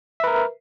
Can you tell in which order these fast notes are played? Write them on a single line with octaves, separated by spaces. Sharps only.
E5 B4 A#4